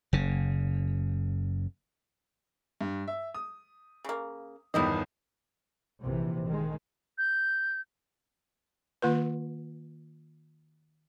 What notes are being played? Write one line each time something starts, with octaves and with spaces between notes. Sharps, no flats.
F#1 C#3
G2
E5
D#6
C#3 A#3
G1 E2 D#3 E4 G4 D#5
A#1 C3 E3
D#3 G#3
G6
D#3 A#3 F4 B4